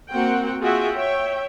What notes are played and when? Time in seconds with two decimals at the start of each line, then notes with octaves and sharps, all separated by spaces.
0.11 A#3 C4 F#4 F#5 G5
0.61 F4 F#4 G#4 E5 F#5 G5
0.97 C#5 E5 G5